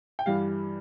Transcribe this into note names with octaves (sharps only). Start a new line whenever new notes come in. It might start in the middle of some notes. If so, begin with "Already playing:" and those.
G5
G2 E3 G3 F5